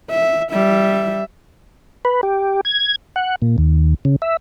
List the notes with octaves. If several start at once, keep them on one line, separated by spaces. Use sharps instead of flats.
E5
G3 E5
B4
G4
G#6
F#5
A#2
D#2
C#3
E5